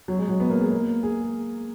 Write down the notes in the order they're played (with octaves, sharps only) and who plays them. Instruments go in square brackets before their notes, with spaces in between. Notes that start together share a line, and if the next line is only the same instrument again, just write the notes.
[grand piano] F#3
G#3
F#3
B3
A#3
G#3
A#3
G#4